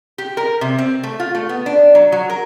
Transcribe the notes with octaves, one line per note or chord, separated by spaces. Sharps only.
G4
A#4
C3
C4
A3
F4
A3
B3
D4
F#3
F#3
A#4